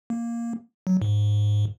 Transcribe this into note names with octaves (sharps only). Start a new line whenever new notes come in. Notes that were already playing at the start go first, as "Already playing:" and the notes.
A#3
F#3
G#2